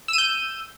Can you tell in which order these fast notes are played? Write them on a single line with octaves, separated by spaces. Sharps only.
E6 D#7 G6